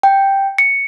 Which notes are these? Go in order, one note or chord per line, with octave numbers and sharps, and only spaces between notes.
G5
C#7